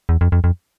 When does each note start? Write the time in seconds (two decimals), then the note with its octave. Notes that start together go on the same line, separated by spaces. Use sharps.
0.09 E2
0.21 F2
0.32 F2
0.44 F2